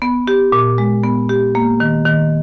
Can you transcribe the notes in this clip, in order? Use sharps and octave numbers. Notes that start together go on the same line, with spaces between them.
B3
G4
A#2
G#3
B3
G4
A#3
D#3
D#3